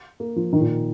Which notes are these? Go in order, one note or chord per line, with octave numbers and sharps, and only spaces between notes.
A#3
F3
D#3
A#2